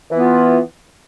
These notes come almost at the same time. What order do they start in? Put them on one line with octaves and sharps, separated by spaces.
E3 B3 F4